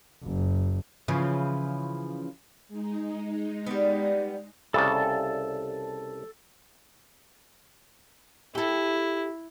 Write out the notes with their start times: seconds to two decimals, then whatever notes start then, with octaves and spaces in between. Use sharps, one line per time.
0.23 F#1
1.08 C#3 E3 F3
2.68 G#3 D#4
3.66 G3 B3
4.74 C2 C#3 A4 D5 A5
8.55 E4 G4 A4